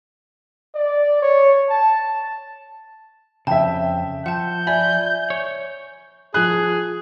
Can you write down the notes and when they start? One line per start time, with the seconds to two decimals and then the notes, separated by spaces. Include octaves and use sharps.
0.75 D5
1.22 C#5
1.70 A5
3.47 F2 C#3 E5 G5 A5
4.26 F3 F#5 A5 G6
4.67 D5 E5 G#5 B5
5.30 C#5
6.34 F3 G#4 F#6